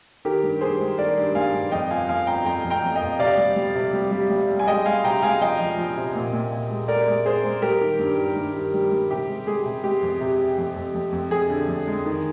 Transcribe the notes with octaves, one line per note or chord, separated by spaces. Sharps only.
D#3 G4 A#4
G2
G2 G#4 C5
G#3
D#3 A#4 D5
G2
G2 F5 G#5
G2
F2 D#5 G5
F3 F5 G#5
F2 F5 G#5
F3 G5 A#5
F2 G5 A#5
F2
G5 A#5
F2
D#5 G5
F2
C3 D5 F5
G3
G3
C3
G3
G3
G3
G3
G#5
G#3 D#5 G5
G#3 F5 G#5
C3 G5 A#5
G#3 F5 G#5
F3 D#5 G5
F3
F3
C3
A#2
A#2
A#2
G#3
G#3 A#4 D5
G#3
G#3 G#4 C5
G#3
G3 G4 A#4
D#3
G2
D#3
G2
D#3
G3
G3
C3 G4
G#3
G#3 G#4
C3
G#3 G4
F2
C3
C3
F2
F2
F2
F2
F2 G#4
D3
F2
G#3
D#3